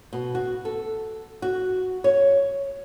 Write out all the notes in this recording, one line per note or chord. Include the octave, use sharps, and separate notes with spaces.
B2
F#4
A4
F#4
C#5